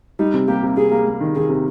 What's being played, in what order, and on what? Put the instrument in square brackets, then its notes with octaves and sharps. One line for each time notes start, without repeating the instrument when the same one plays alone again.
[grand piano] G3 [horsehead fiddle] D#4
[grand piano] C3
[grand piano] A#3 [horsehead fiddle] G4
[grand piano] C3
[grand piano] C3 [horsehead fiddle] G#4
[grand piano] A#3
A#3
D#3
[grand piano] D#3 [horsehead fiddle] G#4
[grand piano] C3